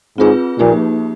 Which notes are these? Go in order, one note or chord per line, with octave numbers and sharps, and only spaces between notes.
G#2 C4 F4 G#4 B4
A#2 F3 A#3 D#4 G4